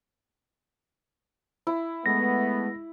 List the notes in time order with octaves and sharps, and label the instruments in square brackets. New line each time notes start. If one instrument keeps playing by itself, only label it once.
[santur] E4
[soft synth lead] G#3 [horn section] A3 B3 [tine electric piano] A#6